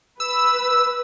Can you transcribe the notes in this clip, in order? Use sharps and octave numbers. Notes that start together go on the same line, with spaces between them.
B4 E6